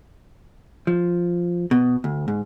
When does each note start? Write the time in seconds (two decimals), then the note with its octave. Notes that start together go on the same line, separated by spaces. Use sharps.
0.87 F3
1.71 B2
2.04 D2
2.28 G#2